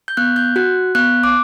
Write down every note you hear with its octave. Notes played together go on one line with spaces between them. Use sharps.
G6
B3 F#6
G6
F#4 F#6
B3 F#6
D6